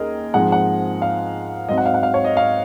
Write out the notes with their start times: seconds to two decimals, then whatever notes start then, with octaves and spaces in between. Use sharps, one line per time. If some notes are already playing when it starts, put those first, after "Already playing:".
Already playing: D#2 D#3 C#4 G#4 A#4 D#5
0.34 G#2 F3 G#3 C4 F#5
0.52 F#5
1.02 F5
1.69 G#2 F#3 C4 D#5
1.78 F#5
1.86 F5
1.94 F#5
2.03 F5
2.14 C#5
2.24 D#5
2.37 F5